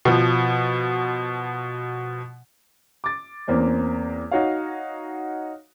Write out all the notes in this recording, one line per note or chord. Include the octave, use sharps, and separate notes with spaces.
B2 F3
D6 A6
E2 A#3 C4 C#4
D#4 F#4 C#5 F5